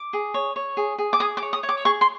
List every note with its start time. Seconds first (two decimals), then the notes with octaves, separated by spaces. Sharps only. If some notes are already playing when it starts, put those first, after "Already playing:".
Already playing: D6
0.13 G#4
0.34 C#5
0.56 C#5
0.77 G#4
0.98 G#4
1.13 D6
1.20 G#4 D#6
1.37 D6
1.42 C#5
1.53 D#6
1.63 C#5
1.69 D6
1.85 G#4 C#6
2.01 C6